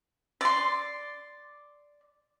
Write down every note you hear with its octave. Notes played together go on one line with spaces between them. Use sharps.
D5 C6